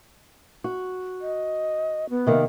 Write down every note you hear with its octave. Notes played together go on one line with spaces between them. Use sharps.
F#4
D#5
B3
C3 D#3 A#3